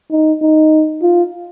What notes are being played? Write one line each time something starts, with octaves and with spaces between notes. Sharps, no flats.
D#4
D#4
F4